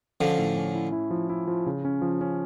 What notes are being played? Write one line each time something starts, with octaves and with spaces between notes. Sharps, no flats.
D3 F3 C#4
A2
C#4
E4
E4
F3
E4
F3
C#3
C#4
F3
C#4